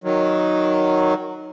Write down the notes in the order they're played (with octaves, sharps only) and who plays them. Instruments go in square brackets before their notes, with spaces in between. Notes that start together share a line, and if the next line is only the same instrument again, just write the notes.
[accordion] D#3 F#3